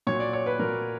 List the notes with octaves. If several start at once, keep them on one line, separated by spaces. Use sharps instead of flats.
A#2 F#3 C#5
D5
C#5
B4
A#2 F#3 A#4